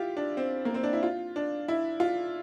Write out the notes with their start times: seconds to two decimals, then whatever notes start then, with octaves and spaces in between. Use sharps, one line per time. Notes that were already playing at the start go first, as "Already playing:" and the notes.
Already playing: E4 F4 G4
0.17 D4
0.37 C4
0.65 A#3
0.74 C4
0.83 D4
0.93 E4
1.03 F4
1.36 D4
1.68 E4
2.00 F4